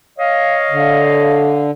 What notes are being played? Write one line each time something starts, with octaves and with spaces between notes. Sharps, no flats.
C#5 D#5 F5
D3